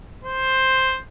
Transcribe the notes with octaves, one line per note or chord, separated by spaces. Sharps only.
C5